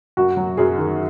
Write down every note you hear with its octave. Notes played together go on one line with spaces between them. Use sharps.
F#2 F#4
F#3
F#2 G#4
D#3